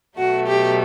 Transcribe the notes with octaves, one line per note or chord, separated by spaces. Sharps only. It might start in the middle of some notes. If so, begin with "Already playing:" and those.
B2 F#3 A3 F#4
G4